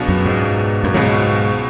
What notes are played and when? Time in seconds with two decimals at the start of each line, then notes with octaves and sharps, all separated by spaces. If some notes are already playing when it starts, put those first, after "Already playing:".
Already playing: C#2 B2 F#3 B3 D4
0.08 F#2
0.25 G#2
0.84 F#2
0.94 C#2 G#2 B2 F#3